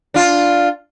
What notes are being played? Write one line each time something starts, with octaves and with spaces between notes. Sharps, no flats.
D4 F4